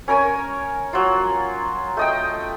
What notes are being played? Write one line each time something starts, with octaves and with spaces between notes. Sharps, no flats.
C#4 A#4 C#5 G#5
F#3 F4
A3 D#5 G5